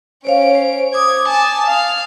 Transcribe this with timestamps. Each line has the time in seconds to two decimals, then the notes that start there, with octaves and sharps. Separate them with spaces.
0.25 C#4 C5 C#5 F5 D7
0.55 C5
0.94 D6 D#6 G#6
1.28 G#5 A5
1.67 F5